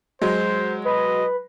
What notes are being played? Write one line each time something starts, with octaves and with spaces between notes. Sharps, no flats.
F#3 G#3 C5
B4 D#5